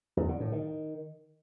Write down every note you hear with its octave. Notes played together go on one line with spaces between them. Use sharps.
E2
D3
A2
D#3